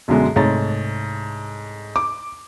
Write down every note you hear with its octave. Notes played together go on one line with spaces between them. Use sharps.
B1 F#2 B2 D3 G#3
C2 G#2 A3 C#5 A6
D6